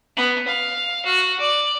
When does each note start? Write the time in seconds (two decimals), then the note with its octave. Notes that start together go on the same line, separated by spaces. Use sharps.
0.16 B3
0.47 F5
1.05 F#4
1.40 D5